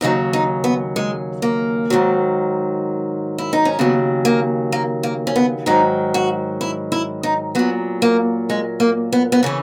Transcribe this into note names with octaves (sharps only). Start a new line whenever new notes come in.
D#2 C#3 F#3 D#4
D#4
B3
G#3
A#3
G#2 D#3 F#3
E4
D#4
C#4
D#2 C#3 F#3 B3
A#3
A#3
A#3
C#4
B3
G#2 D#3 F#3 D#4
F#4
E4
E4
D#4
A#2 F#3 B3
A#3
G#3
A#3
B3
B3
C#3 E3 C#4